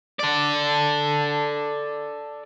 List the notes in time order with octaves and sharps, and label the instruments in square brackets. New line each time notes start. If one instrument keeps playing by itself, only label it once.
[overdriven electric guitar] A4 D5